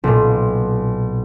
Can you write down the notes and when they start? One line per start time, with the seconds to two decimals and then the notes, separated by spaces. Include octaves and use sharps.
0.04 B1 A#2